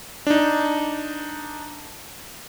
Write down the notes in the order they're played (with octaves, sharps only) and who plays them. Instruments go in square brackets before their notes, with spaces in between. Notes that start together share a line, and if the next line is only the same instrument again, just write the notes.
[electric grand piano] D4 D#4